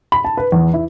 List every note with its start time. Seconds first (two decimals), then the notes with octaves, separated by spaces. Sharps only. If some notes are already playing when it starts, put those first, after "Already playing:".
0.12 B5
0.25 A5
0.37 B4
0.52 E2
0.74 E4